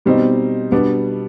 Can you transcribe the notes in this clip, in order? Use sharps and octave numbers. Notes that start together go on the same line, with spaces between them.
B2 G3 C4 D#4
B2 G3 B3 D4